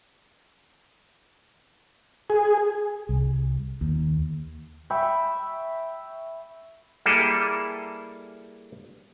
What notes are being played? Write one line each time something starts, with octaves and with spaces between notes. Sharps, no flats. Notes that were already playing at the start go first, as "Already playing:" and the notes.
G#4
C2
D#2
E5 G5 B5 C#6
G3 A#3 E4 G#4 A4